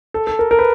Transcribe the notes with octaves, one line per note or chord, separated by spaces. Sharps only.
A4
A4
A#4
A#4
B4